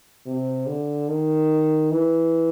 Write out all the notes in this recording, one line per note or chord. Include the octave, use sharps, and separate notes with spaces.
C3
D3
D#3
E3